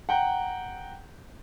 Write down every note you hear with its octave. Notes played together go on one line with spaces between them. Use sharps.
F#5 G5 A#5